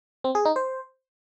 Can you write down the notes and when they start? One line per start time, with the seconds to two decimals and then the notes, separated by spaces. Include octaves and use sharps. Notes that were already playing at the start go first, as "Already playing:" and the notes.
0.24 C4
0.35 G#4
0.45 D#4
0.56 C5